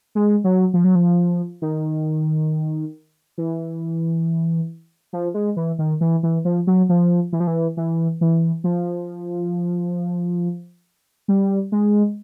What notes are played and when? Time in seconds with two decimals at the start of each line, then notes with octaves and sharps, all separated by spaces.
0.15 G#3
0.44 F#3
0.74 F3
0.84 F#3
0.95 F3
1.62 D#3
3.38 E3
5.13 F3
5.34 G#3
5.57 E3
5.79 D#3
6.01 E3
6.23 E3
6.45 F3
6.67 F#3
6.89 F3
7.33 E3
7.40 F3
7.47 E3
7.77 E3
8.21 E3
8.64 F3
11.28 G3
11.72 G#3